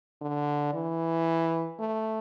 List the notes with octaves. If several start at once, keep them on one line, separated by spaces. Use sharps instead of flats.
D3
E3
A3